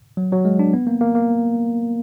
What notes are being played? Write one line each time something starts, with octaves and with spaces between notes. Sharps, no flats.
F#3
F#3
G#3
D4
B3
A#3
A#3
A#3